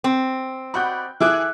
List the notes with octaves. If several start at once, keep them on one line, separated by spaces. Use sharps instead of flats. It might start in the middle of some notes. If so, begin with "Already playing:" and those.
C4
F#4 D5 D#5 B5 F#6 G6
E3 G#4 A4 E5 D6 F#6